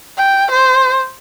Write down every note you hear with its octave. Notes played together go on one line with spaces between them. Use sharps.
G5
C5